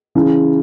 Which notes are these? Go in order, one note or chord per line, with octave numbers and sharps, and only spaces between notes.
C#3 E3